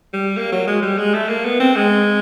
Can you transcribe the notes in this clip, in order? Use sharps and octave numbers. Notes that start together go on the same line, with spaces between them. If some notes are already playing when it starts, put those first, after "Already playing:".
G3
A#3
F#3
G#3
G3
G#3
A3
A#3
B3
C4
G#3